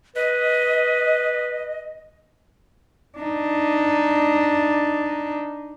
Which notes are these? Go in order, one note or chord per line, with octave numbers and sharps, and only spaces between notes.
B4 D#5
D4 D#4